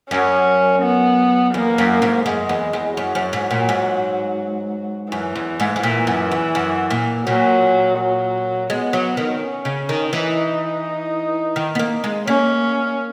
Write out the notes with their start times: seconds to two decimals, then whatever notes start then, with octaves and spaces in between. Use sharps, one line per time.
0.11 F#2 C#4
0.83 B3
1.54 E2 A#3
1.78 F#2
2.02 G#2
2.26 F#2 G#3
2.49 E2
2.73 E2
2.97 F#2 F#3
3.15 F#2
3.33 G#2
3.51 A#2
3.69 G#2
5.12 F#2 E3
5.35 E2
5.60 G#2
5.76 G#2
5.83 A#2 E3
6.07 F#2
6.31 E2
6.55 F#2
6.90 A#2
7.27 A#2 F#3
7.98 F#3
8.70 G#3 B3
8.93 F#3
9.17 D#3
9.41 C#4
9.65 C#3
9.89 D#3
10.13 E3 D#4
11.56 D#3
11.75 B3
11.79 A#3
12.04 G#3
12.27 A#3 C#4